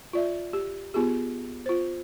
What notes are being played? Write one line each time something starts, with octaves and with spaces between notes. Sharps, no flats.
F4 D5 E5
G4
B3 F4 G4 G#4
F4 C5